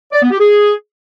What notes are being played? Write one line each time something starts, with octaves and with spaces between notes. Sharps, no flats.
D5
B3
G4
G#4